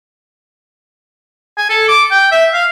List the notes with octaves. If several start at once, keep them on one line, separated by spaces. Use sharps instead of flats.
G#5
A4
D6
G5
E5
F5